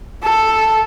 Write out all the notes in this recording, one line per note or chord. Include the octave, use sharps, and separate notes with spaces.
A4